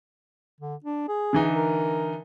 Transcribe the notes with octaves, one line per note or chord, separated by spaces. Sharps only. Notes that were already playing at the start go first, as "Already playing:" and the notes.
D3
D4
G#4
D3 E3 D#4
A#4